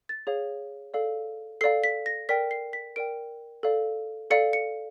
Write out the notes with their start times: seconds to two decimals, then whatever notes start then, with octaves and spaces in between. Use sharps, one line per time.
0.09 A6
0.27 G#4 C#5 F5
0.94 A4 D5 F5
1.61 A4 D5 F5 C7
1.84 B6
2.06 A#6
2.29 A#4 D5 G5 B6
2.51 C7
2.73 B6
2.96 A#4 D5 G5 D7
3.63 A4 D5 F5
4.30 A4 D5 F5 C#7
4.53 C#7